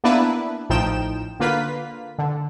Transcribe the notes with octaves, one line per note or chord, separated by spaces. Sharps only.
A#3 B3 D4 E4 B4
A1 A2 F3 D#4 G5 E7
D3 A#3 F4 B4 B6
D3